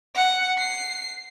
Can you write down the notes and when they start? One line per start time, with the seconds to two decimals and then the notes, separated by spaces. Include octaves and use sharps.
0.15 F#5
0.58 C7